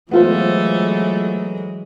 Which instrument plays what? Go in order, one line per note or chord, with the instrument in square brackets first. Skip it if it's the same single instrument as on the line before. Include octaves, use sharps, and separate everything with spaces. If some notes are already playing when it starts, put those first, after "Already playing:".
[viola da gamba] E3 F#3 G#3 [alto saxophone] A3 [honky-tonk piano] B3 F4 C5